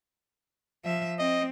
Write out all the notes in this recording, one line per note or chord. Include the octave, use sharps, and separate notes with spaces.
F3 E5
C4 D#5